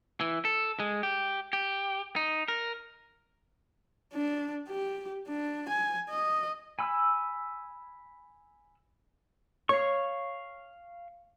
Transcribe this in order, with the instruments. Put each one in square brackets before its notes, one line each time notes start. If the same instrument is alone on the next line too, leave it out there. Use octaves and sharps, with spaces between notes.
[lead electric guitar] E3
A4
G#3
G4
G4
D#4
A#4
[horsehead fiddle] D4
G4
D4
G#5
D#5
[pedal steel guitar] G#5 B5 E6
[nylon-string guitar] C#5 [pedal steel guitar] F5 C#6